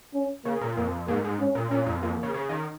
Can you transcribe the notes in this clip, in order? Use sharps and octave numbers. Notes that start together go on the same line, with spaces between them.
C#4
C#3 A#3
A#2
F2 A#3
G#2 A#3
G#2
C#4
A#2
A#2 C#4
F2
F2 A#3
C#3
C#3
D#3